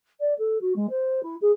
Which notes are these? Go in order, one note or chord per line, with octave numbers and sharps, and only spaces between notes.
D5
A4
F#4
G#3
C5
E4
G#4